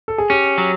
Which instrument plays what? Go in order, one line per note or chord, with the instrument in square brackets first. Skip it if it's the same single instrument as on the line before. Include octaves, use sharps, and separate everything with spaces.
[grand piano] A4
G#4
[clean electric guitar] C#4 [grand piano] G4
[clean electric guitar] F#3